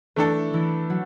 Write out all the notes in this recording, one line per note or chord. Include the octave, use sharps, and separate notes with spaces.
E3 A3 D4 E4 A4
E3 E4
F#3 F#4